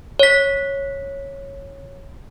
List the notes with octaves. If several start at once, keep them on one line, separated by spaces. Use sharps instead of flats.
C#5 B6